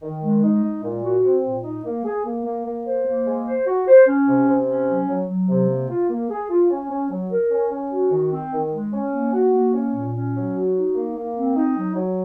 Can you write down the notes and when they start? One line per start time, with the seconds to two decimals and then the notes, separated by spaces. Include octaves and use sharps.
0.02 D#3
0.23 G#3
0.43 D#4
0.64 G#3
0.83 A#2
1.04 F#4
1.25 C4
1.44 A#2
1.64 D#4
1.85 A#3
2.05 G#4
2.26 A#3
2.45 A#3
2.66 A#3
2.86 C5
3.06 A#3
3.27 G#3
3.46 C5
3.67 F#4
3.88 C5
4.07 C#4
4.28 C3
4.48 C3
4.68 C#4
4.88 F#3
5.09 F#3
5.28 F#3
5.49 C3
5.69 A#3
5.90 F4
6.10 A#3
6.30 G#4
6.50 F4
6.71 C#4
6.90 C#4
7.11 F#3
7.31 A#4
7.51 C#4
7.71 C#4
7.92 F#4
8.12 D#3
8.32 C4
8.53 D#3
8.73 G#3
8.93 C#4
9.13 A#3
9.34 F#4
9.54 A#3
9.74 C#4
9.94 A#2
10.14 C#4
10.34 F#3
10.55 F#4
10.75 D#4
10.95 A#3
11.15 A#3
11.36 C4
11.56 D#4
11.76 F#3
11.96 F#3